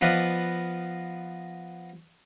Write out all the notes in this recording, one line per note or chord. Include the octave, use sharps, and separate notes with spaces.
F3 B3 B4 D5 D#5 F5